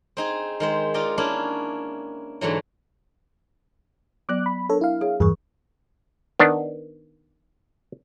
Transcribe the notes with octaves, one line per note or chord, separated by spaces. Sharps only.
C4 D#4 G#4
D#3 G#3 C5
D#4 F4 D5 D#5
A#3 C#4 D4 E4
G#2 D3 E3 F#3
F#3 B3 D5 D6 F#6
B5
D4 A4 A#4 C#5
E4 F5
G#4 C#5
E2 G2 E3 G#4 C#6
D#3 B3 D4